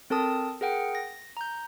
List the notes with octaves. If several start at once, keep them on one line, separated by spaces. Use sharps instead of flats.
C4 A4 A#4 A5 D#6
G#4 A#4 F#5 G5
A#6
A#5 G6